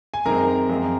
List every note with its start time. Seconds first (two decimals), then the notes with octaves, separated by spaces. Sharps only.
0.14 G#5
0.25 F#2 D#3 G#3 C4 A#4 A#5
0.70 F#2 F3 G#3 C4